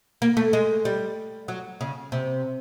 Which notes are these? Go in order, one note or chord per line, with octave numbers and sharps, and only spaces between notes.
A#3
A3
G#3
G3
F#3
C#3
C3